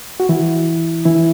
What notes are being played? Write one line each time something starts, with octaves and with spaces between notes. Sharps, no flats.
F#4
E3 E4
E3 E4